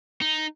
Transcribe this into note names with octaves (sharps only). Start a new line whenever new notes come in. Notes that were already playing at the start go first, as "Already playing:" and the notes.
D#4